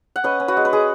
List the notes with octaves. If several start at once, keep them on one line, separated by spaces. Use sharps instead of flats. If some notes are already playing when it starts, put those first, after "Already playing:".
F#5
C#4 B4 D#5
C#4
F#4 B4
G#3
B4
G#3 G#4